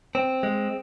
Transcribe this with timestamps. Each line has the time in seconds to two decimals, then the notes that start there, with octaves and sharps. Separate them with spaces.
0.15 C4
0.43 G#3